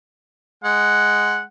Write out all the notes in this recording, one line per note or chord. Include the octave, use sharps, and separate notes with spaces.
G#3 F#5